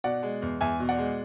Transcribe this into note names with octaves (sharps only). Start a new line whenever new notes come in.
B2 D5 F#5
G#3
E2
E2 E5 G#5
B2
D5 F#5
G#3